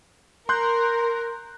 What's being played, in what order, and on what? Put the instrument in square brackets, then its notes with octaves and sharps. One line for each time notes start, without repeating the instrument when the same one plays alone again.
[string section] A#4 [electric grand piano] C6 F#6 G6